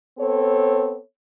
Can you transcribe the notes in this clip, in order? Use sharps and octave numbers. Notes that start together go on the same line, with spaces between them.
B3 C4 A4 C#5